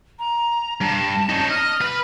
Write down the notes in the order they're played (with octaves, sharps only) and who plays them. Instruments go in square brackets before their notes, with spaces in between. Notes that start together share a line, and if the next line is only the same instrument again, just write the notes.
[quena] A#5
[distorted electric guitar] G2 [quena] A5
[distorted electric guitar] C#4 D#4
[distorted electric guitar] D#5 [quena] F6
[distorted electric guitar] B4